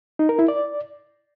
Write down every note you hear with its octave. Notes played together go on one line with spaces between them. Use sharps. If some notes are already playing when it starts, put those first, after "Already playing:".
D#4
A#4
E4
D5